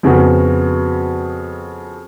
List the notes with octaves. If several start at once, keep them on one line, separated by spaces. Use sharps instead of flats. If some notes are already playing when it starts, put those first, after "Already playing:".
F2 C#3 B3 F#4